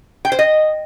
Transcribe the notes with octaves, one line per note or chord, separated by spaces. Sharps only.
G5
C5
D#5